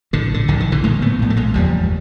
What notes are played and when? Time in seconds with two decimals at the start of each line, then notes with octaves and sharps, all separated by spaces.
0.13 A#1 A2 D3
0.34 D3
0.48 A#1 A2 D3
0.60 D#3
0.72 D3 E3
0.84 A#1 A2 G#3 A#3
1.02 A3 B3
1.19 A#1 A2
1.30 A3
1.36 G#3 A#3
1.54 F#1 E2 C#3 F3 G3